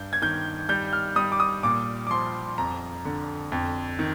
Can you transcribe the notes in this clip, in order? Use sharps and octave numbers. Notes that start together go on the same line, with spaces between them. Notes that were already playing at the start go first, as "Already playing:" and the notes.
Already playing: G2 G6
G#6
D#3 G6
G3 G6
F6
G3 D#6
D6
D#6
A#2 D6
D6
F3 C6
F2 A#5
D3
F2
D#3